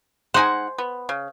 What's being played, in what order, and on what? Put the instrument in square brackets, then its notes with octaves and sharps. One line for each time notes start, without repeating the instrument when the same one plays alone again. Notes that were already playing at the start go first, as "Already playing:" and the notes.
[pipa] G#3 D#4 F#5 [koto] C5 G#5
[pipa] B3
C#3